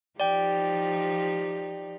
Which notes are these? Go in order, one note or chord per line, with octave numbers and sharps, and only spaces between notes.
F3 D#4 G4 D5 G5